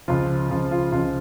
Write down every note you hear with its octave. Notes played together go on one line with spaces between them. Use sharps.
C#2 C#3 F3 F4
C#2 C#3 F3
F4
C#2 C#3 F3 F4